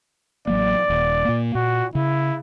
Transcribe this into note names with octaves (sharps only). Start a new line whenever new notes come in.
A1 F#3 A#3 D5
D#1
A#2 A#3
A#2 F#4
C#3 E4